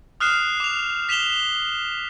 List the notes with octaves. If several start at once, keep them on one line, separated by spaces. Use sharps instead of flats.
D#6 F6 F#6 C7 E7
D6 F7
B6 E7 F7 G7